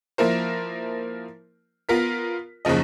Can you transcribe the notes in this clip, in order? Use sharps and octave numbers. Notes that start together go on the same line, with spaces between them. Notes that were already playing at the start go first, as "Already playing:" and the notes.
F3 A#3 E4 A#4 C5
B3 F4 A#4 B6
F#1 D#2 C#3 F3 D#5